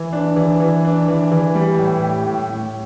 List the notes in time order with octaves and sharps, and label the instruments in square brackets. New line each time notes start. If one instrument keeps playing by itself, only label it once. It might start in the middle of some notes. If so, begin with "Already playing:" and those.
Already playing: [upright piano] E3
D4
E3
E3
D4
E3
E3
G3
A2
G4
A2
A2